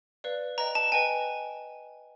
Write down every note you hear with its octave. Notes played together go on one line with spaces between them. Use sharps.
B4 D5 F5
B4 D#5 G5 A#5
A5
B4 D#5 G5 G#5